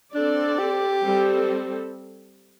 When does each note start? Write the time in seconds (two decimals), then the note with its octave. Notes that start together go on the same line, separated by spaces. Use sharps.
0.15 C4 D4 A4 D5
0.59 G4
1.03 G3 C4 A4